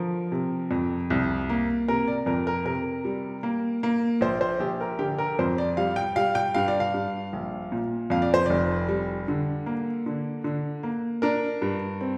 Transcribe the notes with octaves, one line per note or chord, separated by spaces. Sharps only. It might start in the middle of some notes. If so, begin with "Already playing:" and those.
Already playing: D3 F3 A#4
C3
F2
C2
A#3
C3 A#4
D5
F2 A#4
A#4
C3 A#4
G3
A#3
A#3
A#1 C5
C5
A#1 G4
A#4
D3 G4
A#4
F2 C5
D5
G3 F5
G5
G3 F5
G5
G2 F5
D5
F5
G2
A#1
A#2
F2 F5
D5
C5
F1 D5
G3
D3
A#3
D3
D3
A#3
D4 A#4
G2
C4